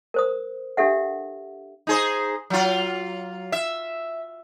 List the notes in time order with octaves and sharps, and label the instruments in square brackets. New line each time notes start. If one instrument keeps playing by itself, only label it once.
[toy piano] A#4 C5 D#6
D4 G4 A4 E5 F#5
[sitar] D#4 G#4 C5
F#3 F4
E5